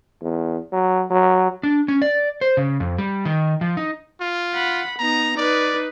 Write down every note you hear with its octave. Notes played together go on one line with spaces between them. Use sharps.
E2
F#3
F#3
D4
C#4
D5
C5
C#3
F2
G3
D#3
F3
D#4
F4
F#5 B5
B3 D#4 A#5
D#4 B4 D5